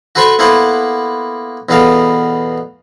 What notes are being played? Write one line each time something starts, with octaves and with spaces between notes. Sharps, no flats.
F#4 A4 B4 C5 B5 C#6
A#3 B3 E4 A4 C5 F#5
E2 B2 B3 A4 F5 A#5